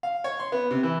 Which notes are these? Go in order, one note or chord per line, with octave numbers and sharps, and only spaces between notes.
F5
C#5
C6
B3
C3
E3